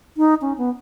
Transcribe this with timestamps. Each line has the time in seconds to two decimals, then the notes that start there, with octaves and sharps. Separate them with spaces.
0.17 D#4
0.42 C#4
0.58 B3